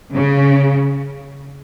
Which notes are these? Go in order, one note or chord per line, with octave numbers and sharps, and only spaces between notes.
C#3